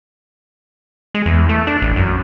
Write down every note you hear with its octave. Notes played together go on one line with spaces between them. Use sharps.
G#3
E2
A3
D4
A1
F#2